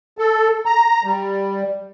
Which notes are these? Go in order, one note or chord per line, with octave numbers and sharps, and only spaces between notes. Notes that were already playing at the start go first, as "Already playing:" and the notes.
A4
A#5
G3